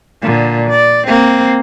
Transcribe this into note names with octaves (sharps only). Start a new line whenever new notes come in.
A#2 D3
D5
A#3 C4